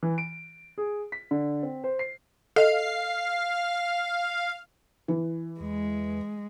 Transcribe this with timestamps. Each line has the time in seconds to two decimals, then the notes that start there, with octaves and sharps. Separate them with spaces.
0.03 E3
0.18 D7
0.78 G#4
1.12 B6
1.31 D3
1.63 C4
1.84 C5
1.99 C7
2.56 A4 D#5 F5
5.08 E3
5.60 E2 G#3